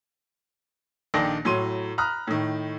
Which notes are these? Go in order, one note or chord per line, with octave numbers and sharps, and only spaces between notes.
A#1 D#3 D4 A4 G5 A#6
A2 F#3 C6 D#7
A#5 B5 D#6 F6 F#6
A2 D#3